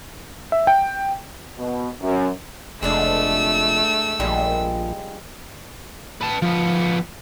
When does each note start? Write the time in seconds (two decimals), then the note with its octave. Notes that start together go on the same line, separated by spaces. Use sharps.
0.52 E5
0.67 G5
1.58 B2
2.01 F#2
2.83 F1 G#3 A3 D4 F5 E6
4.20 A#1 F3 G3 G#3
6.21 B4 A5
6.42 F3 B3